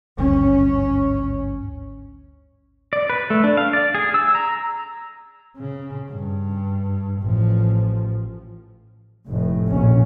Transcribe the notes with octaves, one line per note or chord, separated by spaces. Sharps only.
G#1 D2 G2 C#4
D5
B4
A3
D4
F5
D5
G#4
E6
A#5
C#3
G2
A1 F3
F1 A2
A#1 C#3 C#4